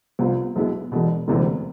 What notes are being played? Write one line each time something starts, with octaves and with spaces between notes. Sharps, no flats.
C2 C3 F3 B3 F4
B1 B2 G#3 B3 E4
E1 E2 B2
E1 D2 C3 E3 B3